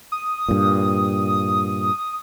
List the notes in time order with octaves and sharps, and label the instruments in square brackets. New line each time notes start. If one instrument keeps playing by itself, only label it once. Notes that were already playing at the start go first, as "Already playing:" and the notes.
[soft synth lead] D#6
[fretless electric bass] G2 A#2